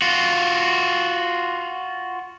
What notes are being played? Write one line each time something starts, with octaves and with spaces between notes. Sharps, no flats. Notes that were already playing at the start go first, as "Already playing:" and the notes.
F4 F#4